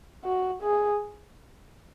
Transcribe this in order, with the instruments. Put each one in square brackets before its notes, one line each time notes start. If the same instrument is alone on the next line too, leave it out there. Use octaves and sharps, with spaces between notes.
[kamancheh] F#4
G#4